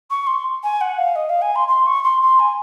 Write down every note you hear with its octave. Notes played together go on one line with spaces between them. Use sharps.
C#6
C6
G#5
F#5
F5
D#5
F5
G#5
C6
C6
C#6
C6
C6
G#5